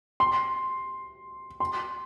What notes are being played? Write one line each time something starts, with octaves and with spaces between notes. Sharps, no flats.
C6
C6